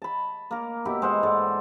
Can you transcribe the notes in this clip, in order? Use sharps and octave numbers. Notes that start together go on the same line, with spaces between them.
A5 B5
A#3 A#4
B2 E4 G4
G#3 C5 F#5
G#2 A4 D5